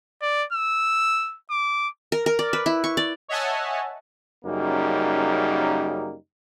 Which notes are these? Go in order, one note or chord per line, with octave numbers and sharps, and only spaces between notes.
D5
E6
D6
A#4
A#4
D5
B4
E4
C#6
D5
C#5 D#5 E5 F#5 G#5 A5
F#2 C#3 G3 A#3 D#4